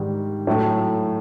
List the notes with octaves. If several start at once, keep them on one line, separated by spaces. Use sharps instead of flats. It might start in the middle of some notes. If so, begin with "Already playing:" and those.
Already playing: G#2 D#3 G3
A2 F#3 A3